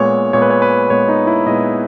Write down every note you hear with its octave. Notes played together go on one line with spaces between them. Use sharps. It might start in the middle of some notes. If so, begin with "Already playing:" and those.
Already playing: A#2 G#3 B3 C#5
A#2 G#3 B3 C#5
B4
C#5
B4
A#2 G#3 B3 C#5
D#4
E4
A#2 G#3 B3 D#5